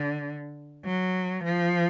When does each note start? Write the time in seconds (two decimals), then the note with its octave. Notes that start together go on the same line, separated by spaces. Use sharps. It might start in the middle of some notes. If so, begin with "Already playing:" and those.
Already playing: D3
0.85 F#3
1.44 F3